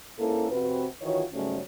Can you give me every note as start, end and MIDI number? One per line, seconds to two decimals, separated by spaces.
0.19 0.49 44
0.19 0.49 58
0.19 0.49 61
0.19 0.49 64
0.19 0.49 69
0.51 0.85 41
0.51 0.85 48
0.51 0.85 60
0.51 0.85 66
0.51 0.85 71
1.02 1.23 51
1.02 1.23 52
1.02 1.23 65
1.02 1.23 66
1.02 1.23 73
1.33 1.59 44
1.33 1.59 49
1.33 1.59 54
1.33 1.59 55
1.33 1.59 57
1.33 1.59 61